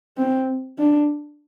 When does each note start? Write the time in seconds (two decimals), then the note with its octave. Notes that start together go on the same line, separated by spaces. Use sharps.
0.17 C4
0.78 D4